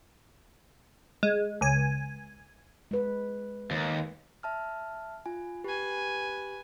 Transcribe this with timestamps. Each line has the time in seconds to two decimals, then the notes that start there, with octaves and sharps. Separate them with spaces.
1.23 G#3
1.61 C#2 G#5
2.91 G#3 B4
3.71 D#2
4.43 E5 A5 F6
5.26 F4 G#5
5.64 G4 B4 G#5